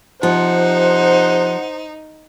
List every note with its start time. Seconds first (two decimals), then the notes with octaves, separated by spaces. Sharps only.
0.23 C3 F3 D#4 C5 F#5